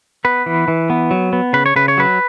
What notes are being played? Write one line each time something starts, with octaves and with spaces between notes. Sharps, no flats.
B3 B4
E3
E3
B3
F#3
B3
C#3 B4
C#5
C#3 B4
C#5
F#3 B4